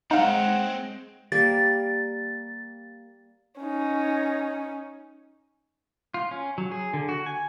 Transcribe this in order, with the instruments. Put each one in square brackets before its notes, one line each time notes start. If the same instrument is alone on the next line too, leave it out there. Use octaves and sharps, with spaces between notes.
[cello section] G#3 [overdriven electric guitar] C4 C#5 [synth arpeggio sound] D#4 F5 [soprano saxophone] F#5
[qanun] G3 A#3 [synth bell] A6
[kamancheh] C#4 D#4
[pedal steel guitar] F4
C#4
F#3
G#4
D3
F#4
G#5